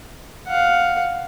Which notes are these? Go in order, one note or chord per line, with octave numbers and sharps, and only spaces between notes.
F5 F#5